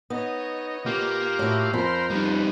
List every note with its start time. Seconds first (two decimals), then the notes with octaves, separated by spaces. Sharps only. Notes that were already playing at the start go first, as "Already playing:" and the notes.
0.10 B3 D#4 C#5 D#5
0.86 A#2 A#3 F4 G4
1.39 A2 E4 F#4
1.73 F2 A#4 C5 B5 C6
2.10 G3 B3 D#4